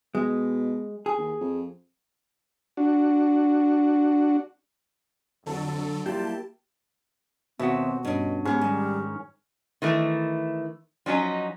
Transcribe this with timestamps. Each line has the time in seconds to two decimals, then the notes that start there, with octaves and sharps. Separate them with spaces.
0.15 B2 G#3
1.06 G#4
1.18 D#2
1.40 F2
2.77 D4 F#4
5.46 F2 D3 F#3 A4
6.06 F#3 G3 A#3 E4 F4 G4 G5 A5
7.59 D#2 B2 C4 F#4 E5
8.05 G2 C#4 D#5
8.45 G#2 B3 C#4 G4 G#4
8.61 D#3 G3
9.82 D#3 E3 A3
11.06 F3 F#3 C#4 D#4